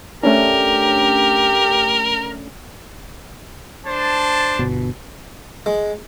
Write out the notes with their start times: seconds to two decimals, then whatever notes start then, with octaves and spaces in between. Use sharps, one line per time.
0.23 A3 C#4 D4 G4 A#4
3.85 D4 C5 A5
4.59 G1 B2
5.66 G#3